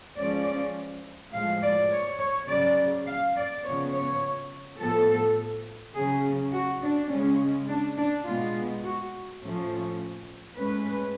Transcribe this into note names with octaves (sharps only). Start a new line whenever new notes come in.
F3 G#3 C#4 D5
A2 F3 G#3 F5
D5
C#5
C#5
C#3 F#3 C#4 D5
F5
D5
C#3 F3 B3 C#5
C#5
A2 F3 B3 A4
C#3 F#3 C#4 G#4
F#4
D4
C#3 G#3 C#4
D4
D4
B2 G#3 B3 F4
F#4
A2 F3 A3 C#4
A2 G#3 C#4 B4